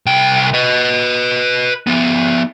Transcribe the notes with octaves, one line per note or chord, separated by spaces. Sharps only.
C2 G5
B4 D#5
F3 B3